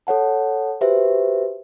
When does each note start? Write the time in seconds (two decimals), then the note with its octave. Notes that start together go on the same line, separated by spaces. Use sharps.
0.07 A4 C#5 F#5 A5
0.81 F#4 G4 B4 C5 E5